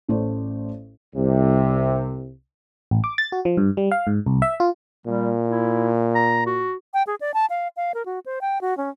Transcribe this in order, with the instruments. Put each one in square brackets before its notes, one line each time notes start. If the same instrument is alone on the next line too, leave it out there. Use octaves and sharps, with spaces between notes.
[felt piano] A1 A3 C5 D5
[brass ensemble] C2 C3
[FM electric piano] A1
D6
A6
F#4
F3
G2
G3
F5
G#2
C2
E5
F4
[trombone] A#2 [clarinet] G3
[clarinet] E4
A#5
F#4
[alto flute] G5
G#4
D5
A5
F5
F5
A#4
F#4
C5
G5
F#4
C#4